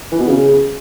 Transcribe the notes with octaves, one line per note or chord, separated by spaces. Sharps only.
E3
B2
C#3